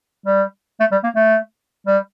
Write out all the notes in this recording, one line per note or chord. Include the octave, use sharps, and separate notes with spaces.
G3
A3
G3
A#3
A3
G3